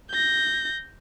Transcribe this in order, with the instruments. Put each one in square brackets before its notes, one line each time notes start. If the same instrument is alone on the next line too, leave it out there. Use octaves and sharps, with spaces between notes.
[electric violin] G6 A#6